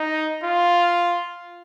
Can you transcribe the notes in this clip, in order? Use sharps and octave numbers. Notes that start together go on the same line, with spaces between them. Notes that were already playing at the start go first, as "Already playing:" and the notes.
Already playing: D#4
F4